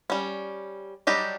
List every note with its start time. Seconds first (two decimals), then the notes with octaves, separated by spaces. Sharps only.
0.10 G3 C#4
1.07 F#3 G3 D4 G4 D#5